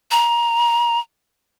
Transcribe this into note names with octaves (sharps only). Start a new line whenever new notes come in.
A#5